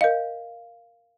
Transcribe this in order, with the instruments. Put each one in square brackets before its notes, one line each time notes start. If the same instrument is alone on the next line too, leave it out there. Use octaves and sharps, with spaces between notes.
[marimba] A#4 D#5 [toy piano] F5